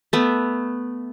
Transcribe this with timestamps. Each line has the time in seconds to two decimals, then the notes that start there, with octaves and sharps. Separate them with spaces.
0.13 A3 B3